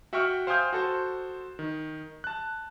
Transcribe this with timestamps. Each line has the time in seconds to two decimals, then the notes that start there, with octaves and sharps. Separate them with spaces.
0.13 F#4 E5 F#5 G5 C#6 F6
0.47 C5 F5 G5 G#5 D#6 G6
0.73 F#4 A4 C5
1.59 D#3
2.24 A5 F#6